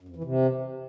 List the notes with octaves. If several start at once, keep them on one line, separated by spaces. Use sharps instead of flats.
F#2
F2
E3
C3